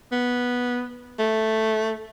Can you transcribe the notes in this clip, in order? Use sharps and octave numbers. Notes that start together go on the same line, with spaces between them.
B3
A3